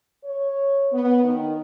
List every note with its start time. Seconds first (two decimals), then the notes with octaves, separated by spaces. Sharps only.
0.24 C#5
0.93 B3
1.24 D#3